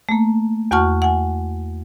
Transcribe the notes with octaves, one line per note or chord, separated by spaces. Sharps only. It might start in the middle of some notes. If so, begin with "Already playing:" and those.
A3 A#3
E2 F#4 F#5 A5 C#6 F6
F#5 G#5